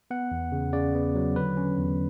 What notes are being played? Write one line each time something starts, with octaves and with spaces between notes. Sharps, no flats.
B3 F#5
E2
C#3
C#3 D5
B3
F#3
D3 B4
C#4
E2